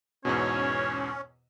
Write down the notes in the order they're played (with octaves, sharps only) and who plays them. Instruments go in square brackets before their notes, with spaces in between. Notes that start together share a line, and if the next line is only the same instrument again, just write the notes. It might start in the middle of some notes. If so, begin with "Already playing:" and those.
[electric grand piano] E2 G#2 B2 [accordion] C#4 [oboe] C#5